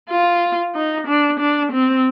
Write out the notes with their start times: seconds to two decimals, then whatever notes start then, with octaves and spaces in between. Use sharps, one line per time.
0.10 F4
0.75 D#4
1.07 D4
1.40 D4
1.72 C4